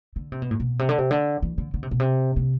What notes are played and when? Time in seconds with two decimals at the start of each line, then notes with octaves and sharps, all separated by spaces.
0.16 D3
0.32 C3
0.42 B2
0.51 A2
0.60 B2
0.79 C3
0.89 D3
0.98 C3
1.11 D3
1.42 E3
1.58 D3
1.74 D3
1.83 C3
1.91 B2
2.00 C3
2.36 C3